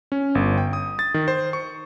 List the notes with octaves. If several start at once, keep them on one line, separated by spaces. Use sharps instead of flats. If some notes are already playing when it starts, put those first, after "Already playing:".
C#4
G1
G5
D#6
A6
D#3
C5
C#6